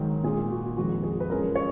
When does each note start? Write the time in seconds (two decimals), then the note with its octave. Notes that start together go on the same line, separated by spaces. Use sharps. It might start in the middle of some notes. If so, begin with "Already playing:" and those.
Already playing: G#2 D#3 F#3
0.23 A#2 G#4
0.28 G#3
0.51 F#4
0.77 F2 D#3 G#3 F#4
1.03 G#4
1.20 B4
1.30 F#2 F3 G#3 A#4
1.55 C#5